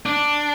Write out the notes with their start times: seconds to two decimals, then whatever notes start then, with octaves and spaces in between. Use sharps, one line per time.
0.06 D4